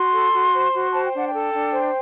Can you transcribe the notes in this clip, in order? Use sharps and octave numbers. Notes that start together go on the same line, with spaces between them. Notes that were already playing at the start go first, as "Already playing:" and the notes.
Already playing: F#4 C6
A4
F#4
C5
F#4
C5 A5
G5
D4 F#5
G5
A4
D4
C5